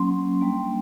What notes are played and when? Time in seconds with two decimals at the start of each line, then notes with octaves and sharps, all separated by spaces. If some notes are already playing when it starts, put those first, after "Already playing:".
Already playing: F#3 A#3 C#4 C6
0.40 G3 A#3 D4